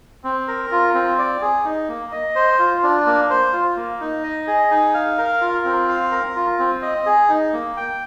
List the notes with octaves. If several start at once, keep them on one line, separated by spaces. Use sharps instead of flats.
C4
A#4
F4
C4
D5
G#4
D#4
A#3
D#5
C5
F4
D4
A#3
C5
F4
A#3
D#4
D#5
G#4
D#4
F5
A#4
F4
C4
F5
A#4
F4
C4
D#5
G#4
D#4
A#3
G5